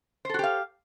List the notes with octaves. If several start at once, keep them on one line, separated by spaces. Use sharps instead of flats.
F#4 G4 A4 C5 F5